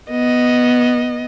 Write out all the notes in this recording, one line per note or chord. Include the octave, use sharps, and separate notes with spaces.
B3 D#5